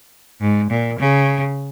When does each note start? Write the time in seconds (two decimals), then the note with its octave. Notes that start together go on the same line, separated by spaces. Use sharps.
0.41 G#2
0.70 A#2
0.99 C#3